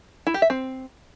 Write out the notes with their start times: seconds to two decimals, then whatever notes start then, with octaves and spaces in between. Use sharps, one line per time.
0.27 E4
0.34 G4
0.42 E5
0.50 C4